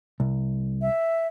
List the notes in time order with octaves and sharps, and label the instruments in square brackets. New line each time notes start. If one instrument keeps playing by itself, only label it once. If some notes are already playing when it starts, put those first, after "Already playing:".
[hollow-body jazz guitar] C2
[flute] E5